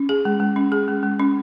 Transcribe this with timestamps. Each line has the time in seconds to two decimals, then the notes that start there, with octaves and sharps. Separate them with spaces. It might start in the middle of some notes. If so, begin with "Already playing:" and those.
Already playing: C#4
0.09 G#4
0.25 G#3
0.40 G#3
0.56 C#4
0.72 G#4
0.88 G#3
1.03 G#3
1.19 C#4